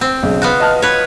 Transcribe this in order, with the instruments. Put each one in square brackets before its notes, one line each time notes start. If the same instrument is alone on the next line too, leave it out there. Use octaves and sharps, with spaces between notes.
[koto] C4
[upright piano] B1 C#3
[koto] B3 F4 F#4
[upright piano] D#5 A5 F6
[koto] B4 C#5